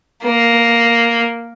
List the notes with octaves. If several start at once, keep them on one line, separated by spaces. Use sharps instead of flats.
A#3